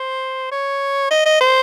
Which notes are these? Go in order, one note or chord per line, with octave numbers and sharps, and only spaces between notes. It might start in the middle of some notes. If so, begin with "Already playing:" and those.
Already playing: C5
C#5
D#5
D#5
C5